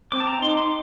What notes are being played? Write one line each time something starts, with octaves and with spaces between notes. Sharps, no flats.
C4 D6
A5
A#5
D#4 C6
D6
C6